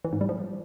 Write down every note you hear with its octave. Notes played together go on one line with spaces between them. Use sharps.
E3
G#2
G3
F3